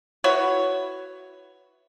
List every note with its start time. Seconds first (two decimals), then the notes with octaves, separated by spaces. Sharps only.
0.24 E4 F#4 B4 C#5